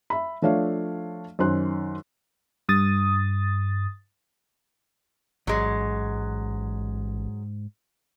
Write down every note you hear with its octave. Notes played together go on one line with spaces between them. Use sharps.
E5 B5
F3 A3 D4 C#5 E5 F5
F#2 D#3 C#4 C5 C6 F#6
G2 D#6 A6
A1 G#2 F#3 G#3